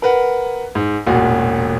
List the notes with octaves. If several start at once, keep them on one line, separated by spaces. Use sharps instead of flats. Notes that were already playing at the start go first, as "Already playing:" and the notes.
A#4 B4 F#5
G#2
E1 A1 A#2 F#4